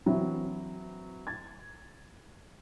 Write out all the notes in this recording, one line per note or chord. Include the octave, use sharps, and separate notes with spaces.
E3 F#3 C4 E4
G#6 A6